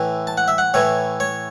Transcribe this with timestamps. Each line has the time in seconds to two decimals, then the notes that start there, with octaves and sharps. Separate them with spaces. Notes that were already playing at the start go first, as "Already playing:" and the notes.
Already playing: A2 E3
0.27 A5
0.38 F#5
0.48 E5
0.58 F#5
0.74 A2 E3 C#5
1.20 C#5